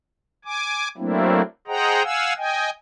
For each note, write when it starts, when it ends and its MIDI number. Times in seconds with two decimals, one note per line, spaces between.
0.45 0.88 80
0.45 0.88 86
0.98 1.42 54
0.98 1.42 57
0.98 1.42 58
0.98 1.42 60
0.98 1.42 62
0.98 1.42 64
1.67 2.03 68
1.67 2.03 72
1.67 2.03 75
1.67 2.03 78
1.67 2.03 79
1.67 2.03 82
2.03 2.33 77
2.03 2.33 78
2.03 2.33 80
2.03 2.33 88
2.37 2.70 75
2.37 2.70 79
2.37 2.70 80